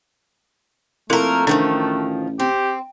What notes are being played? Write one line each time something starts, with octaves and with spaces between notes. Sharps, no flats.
F2 A3 A#3 E4 A4 A#4
A1 D3 D#3 F3 D4
C4 G4